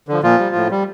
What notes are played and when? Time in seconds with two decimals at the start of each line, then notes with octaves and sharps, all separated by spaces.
0.08 D3 F3
0.23 A#2 F3 F4
0.39 G3
0.56 A2
0.71 G3